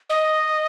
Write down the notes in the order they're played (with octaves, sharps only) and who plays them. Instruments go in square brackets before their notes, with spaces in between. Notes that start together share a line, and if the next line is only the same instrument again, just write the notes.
[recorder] D#5